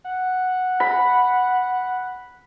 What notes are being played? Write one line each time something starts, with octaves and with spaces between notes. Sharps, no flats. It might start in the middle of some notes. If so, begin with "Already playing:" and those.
F#5
B5